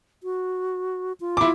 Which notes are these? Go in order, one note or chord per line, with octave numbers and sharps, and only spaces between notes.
F#4
F4
E4 D6